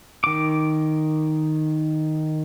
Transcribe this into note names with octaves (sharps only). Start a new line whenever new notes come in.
D#3 D6